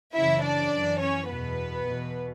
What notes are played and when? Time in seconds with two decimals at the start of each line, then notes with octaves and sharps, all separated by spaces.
0.14 F#2 C#3 E3 E4 E5
0.42 D4 D5
0.71 F#2 E3
1.00 C#4 C#5
1.28 E2 B2 B3 B4
1.86 E2 B2